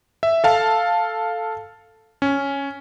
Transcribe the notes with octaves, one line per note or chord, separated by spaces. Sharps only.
E5
A4 F5 A5
C#4